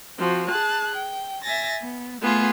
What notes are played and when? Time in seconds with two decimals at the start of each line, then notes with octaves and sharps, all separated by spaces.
0.19 F3 C4 F#4
0.50 G#4 A5 F#6
0.96 G5
1.44 E5 G#5 A6 A#6
1.80 B3
2.20 A3 B3 F4 G#4